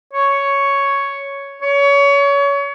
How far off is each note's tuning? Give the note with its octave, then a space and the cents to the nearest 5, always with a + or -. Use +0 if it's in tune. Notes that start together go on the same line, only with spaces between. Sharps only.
C#5 +5
C#5 +25